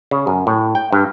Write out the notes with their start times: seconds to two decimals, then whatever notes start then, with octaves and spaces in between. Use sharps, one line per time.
0.11 C#3
0.27 F#2
0.47 A2
0.75 G5
0.92 G2